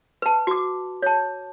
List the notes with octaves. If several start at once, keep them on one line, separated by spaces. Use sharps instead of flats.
B4 A5
F#4 D6
C#5 A5